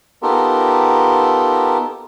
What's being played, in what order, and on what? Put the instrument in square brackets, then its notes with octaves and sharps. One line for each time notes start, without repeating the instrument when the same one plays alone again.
[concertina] B3 D#4 F4 G4 A4 A#4